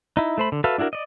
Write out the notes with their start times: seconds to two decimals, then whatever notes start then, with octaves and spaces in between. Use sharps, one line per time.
0.17 D#4 E4
0.38 A3 C5 B5
0.52 D3
0.64 F#4 A4 B4 E5 F5
0.78 D4 E4 F#4 G#4 A#4
0.93 D5 D#5